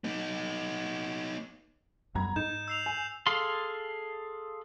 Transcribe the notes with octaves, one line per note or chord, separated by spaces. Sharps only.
B3 D#4
F#2 G3 B3 A#5 G#6
G#2 D#4 G6 E7
E6 C7 F7
G#5
G#4 A4 F5 C6